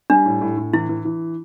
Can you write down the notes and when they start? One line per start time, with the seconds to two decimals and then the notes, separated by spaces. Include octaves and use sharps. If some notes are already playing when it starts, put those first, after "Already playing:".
0.10 G3 D4
0.26 A2
0.41 A2
0.58 A2
0.74 E3 E4
0.89 E3
1.05 E3